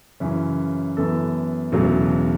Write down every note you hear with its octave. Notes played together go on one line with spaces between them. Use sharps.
F#2 C#3 E3 C#4
F#2 E3 B3 A4
E1 E2 C#3 F#3 A3